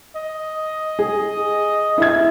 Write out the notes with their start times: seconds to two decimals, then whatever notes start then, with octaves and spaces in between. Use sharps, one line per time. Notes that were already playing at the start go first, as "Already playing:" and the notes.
0.16 D#5
0.99 G#4
1.98 E4 E5 G#6